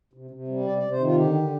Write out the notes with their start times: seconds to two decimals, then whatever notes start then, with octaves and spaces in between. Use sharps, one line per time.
0.13 C3
0.31 C3
0.48 G3
0.65 C3 D5
0.78 C3 D5
0.91 C5
1.00 D#3 D#4
1.04 F4
1.16 D3 G4
1.35 D3